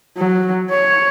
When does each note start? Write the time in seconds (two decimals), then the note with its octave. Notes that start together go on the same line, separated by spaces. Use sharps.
0.17 F#3
0.70 C#5